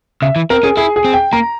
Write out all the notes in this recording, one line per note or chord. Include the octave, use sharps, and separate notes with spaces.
C#3 E5
E3
C4 A#4
C#4 G#4
E4 G#4
G#4
C4
G5
A#3 A#5